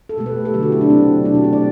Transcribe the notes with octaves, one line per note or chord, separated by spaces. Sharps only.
A4
B2 A3 G4
B4
A4
D3 F#3 A3 G4
F#4
E4
D4
C3 F#3 A3 C4
B2 F#3 A3 D4
F#4
G4
D5